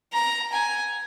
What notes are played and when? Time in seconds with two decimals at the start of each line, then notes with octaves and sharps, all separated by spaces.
0.13 A#5
0.53 G#5